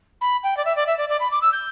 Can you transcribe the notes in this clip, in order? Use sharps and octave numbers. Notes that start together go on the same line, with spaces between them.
B5
G5
D5
E5
D5
E5
D5
D5
B5
D6
E6
G6